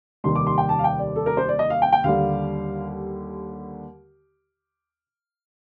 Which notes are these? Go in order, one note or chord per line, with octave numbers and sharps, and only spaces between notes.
F1 D#2 D#3 G3 C6
D6
C6
G5
A5
F5
G5
D5
A4
A#4
C5
D5
D#5
F5
G5
G5
D#2 D3 G3 F5